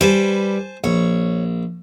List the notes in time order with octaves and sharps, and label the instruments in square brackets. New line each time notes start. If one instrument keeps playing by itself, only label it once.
[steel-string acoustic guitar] G3 B4 [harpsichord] C5 G#5 A5
[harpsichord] A#1 [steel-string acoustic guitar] C#5